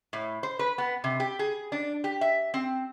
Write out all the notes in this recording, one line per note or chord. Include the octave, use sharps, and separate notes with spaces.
A2
C5
B4
B3
C3
G4
G#4
D4
G4
E5
C4